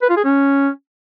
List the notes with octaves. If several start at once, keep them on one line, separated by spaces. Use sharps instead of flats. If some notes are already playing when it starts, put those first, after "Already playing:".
B4
F4
G#4
C#4